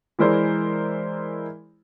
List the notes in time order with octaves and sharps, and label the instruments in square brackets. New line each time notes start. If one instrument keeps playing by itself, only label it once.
[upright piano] E3 G#3 E4 A#4 C5 D5